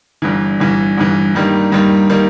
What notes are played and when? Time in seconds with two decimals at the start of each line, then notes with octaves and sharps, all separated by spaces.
0.22 G1 G2 E3
0.60 G1 G2 E3
0.98 G1 G2 E3
1.35 G2 D#3 G3 A#3
1.72 G2 D#3 G3 A#3
2.09 D#3 G3 A#3